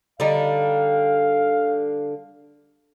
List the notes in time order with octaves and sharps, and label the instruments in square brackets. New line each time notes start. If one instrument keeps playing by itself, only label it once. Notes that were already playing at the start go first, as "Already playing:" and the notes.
[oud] D3 G3 D#4 [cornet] F5